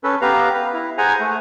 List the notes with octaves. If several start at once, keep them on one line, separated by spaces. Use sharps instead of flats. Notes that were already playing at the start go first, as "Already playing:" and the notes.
C#4 A4 B4
B3 G4 B4 F5 A#5
B4
E4
G#4 C5 F#5 G#5 A#5
A3